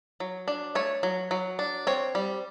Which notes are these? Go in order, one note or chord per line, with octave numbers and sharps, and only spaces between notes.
F#3
D4
A3 C#5
F#3
F#3
D4
C4 C#5
G3